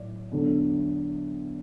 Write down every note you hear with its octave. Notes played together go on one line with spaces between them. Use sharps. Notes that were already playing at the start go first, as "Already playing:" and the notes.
Already playing: A2 F#3 D5
E2 D3 F#3